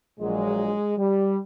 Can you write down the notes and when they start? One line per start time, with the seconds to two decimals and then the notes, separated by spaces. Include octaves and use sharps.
0.19 A#1 A#2 F#3 G#3
0.97 G3